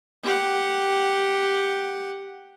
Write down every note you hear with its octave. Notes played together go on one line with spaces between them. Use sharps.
G4 F#5